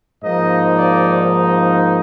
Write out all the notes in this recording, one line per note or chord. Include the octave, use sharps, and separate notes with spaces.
G#2 F3 A#3 D#4 D#5
D5